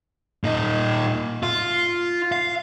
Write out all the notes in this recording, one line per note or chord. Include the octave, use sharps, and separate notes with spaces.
A#2 D#4
F4
F5